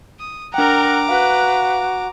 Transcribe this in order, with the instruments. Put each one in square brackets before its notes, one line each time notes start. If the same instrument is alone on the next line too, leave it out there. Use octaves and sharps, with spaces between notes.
[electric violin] D#6
[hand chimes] D4 G5 [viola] A#4 F#5 [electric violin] A#5 D6
[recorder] F#4 [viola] B4 [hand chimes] F5 F#6